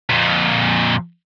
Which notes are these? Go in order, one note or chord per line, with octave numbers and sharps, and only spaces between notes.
F2 A#2